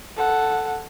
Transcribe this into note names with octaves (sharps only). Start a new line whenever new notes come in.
A4 F#5